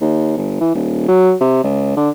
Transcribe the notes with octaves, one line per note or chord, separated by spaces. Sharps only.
D#2
G1
E3
D#1
F#3
C3
C#2
D3